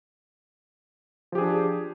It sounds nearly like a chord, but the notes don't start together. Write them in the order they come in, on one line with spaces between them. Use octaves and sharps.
F3 G4 G#4 D4